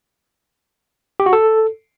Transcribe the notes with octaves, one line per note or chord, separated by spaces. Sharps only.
G4
F#4
A4